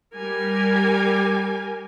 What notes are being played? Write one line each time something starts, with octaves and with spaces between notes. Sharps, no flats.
G3 A#4 G#5